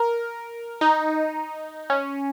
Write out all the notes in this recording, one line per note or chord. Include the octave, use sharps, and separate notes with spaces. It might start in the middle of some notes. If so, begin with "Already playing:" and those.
Already playing: A#4
D#4
C#4